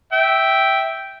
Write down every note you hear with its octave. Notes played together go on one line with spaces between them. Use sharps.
E5 G5